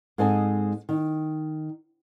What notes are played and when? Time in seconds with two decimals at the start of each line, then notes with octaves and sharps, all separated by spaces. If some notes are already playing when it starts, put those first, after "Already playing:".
0.18 G#2 G#3 C4 A4 D#5 G#5
0.89 D#3